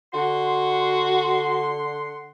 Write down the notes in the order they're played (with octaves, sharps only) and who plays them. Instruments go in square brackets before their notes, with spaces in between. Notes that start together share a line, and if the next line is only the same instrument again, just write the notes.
[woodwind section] D3 F#5 C6 [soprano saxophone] F#4